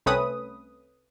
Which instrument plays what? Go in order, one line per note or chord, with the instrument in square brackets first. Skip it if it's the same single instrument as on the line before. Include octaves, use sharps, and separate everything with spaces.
[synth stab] C2 A3 C4 C#4 B4 D#6